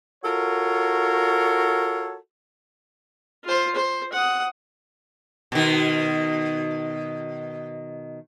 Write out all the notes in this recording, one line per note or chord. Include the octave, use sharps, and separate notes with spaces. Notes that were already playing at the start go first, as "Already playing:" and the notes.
F4 F#4 A4 A#4 C#5
F4 C5
C5
F#5 D#6
B2 D#3